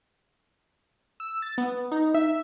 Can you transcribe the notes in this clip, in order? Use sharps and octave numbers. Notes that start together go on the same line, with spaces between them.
E6
A6
B3
D#4
E5